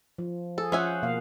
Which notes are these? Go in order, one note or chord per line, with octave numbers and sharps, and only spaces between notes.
F3
G#4 A4
F3 C#4 C5 E5 F#5 G#5
B2 A#3 F5